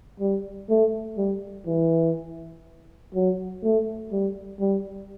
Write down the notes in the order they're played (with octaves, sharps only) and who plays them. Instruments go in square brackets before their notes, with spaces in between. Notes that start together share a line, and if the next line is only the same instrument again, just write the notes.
[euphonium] G3
A3
G3
E3
F#3
A3
G3
G3